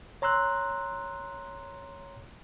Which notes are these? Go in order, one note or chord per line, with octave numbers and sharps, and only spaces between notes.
C#5 A#5 C6 E6 F#6